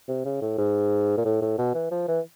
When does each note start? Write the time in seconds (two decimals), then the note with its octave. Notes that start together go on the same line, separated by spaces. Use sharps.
0.08 C3
0.25 C#3
0.42 A2
0.58 G#2
1.17 A#2
1.25 A2
1.42 A2
1.58 B2
1.75 E3
1.91 F3
2.08 E3